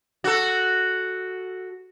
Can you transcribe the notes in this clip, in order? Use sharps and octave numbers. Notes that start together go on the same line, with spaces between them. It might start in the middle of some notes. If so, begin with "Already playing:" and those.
F#4 A4